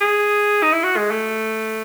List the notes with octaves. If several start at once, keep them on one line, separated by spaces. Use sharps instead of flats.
G#4
D#4
E4
F#4
G#3
A3